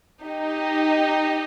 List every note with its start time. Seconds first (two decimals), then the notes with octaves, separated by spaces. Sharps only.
0.22 D#4 G4 D#5